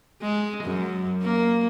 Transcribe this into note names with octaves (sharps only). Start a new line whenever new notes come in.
G#3
F#2
A#3